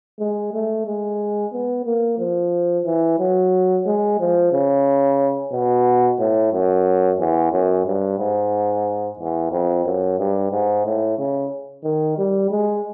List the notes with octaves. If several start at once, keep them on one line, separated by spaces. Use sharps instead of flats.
G#3
A3
G#3
B3
A#3
F3
E3
F#3
G#3
F3
C#3
B2
A2
F#2
E2
F#2
G2
G#2
E2
F2
F#2
G2
G#2
A2
C#3
D#3
G3
G#3